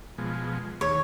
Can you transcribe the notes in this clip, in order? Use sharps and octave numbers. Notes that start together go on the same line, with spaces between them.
B2 F3 G#3
D#2 C#5